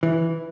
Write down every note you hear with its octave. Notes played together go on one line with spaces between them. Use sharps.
E3